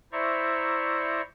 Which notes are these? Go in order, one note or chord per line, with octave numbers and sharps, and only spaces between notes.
E4 C5 D5 E5 A#5 C#6